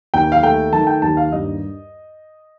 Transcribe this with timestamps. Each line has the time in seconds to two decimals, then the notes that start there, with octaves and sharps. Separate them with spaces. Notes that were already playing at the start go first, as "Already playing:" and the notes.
0.14 D#2 G5
0.32 F5
0.43 A3 G5
0.73 D#3 A5
0.87 G5
1.02 D#2 A5
1.17 F5
1.32 G2 D#5